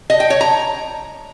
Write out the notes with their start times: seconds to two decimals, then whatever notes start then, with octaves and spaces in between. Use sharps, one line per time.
0.10 D#5
0.20 G5
0.30 C#5
0.41 A#5